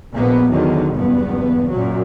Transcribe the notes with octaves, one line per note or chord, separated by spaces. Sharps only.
A#1 A#3 B3
E2 D3 D#3 F#3
F#1 E2 G2 B3
F#2 A#2 F#3